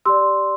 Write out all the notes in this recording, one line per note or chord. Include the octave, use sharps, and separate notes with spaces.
G4 D5 C6 E6